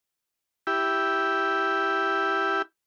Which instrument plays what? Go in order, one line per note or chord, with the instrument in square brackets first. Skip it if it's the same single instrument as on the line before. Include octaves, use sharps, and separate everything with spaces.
[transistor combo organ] E4 G4